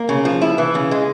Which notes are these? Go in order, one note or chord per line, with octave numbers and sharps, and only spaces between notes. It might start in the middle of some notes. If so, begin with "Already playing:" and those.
Already playing: A#3
C#3
F3
E4
E3
C#3
G#3